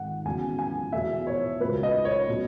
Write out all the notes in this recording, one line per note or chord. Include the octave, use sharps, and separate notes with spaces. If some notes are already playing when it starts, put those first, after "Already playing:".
Already playing: G#1 G#2 D#3 F#5
E2 C#3 F#3 A3 G#5
G#5
E2 B2 A3 E5
C#5
C#2 C#3 F#3 A3 B4
D#5
C#5
B2 F#3 A3